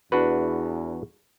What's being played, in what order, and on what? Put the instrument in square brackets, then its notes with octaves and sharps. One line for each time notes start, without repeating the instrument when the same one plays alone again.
[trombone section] E2 [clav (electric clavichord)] D4 F#4 B4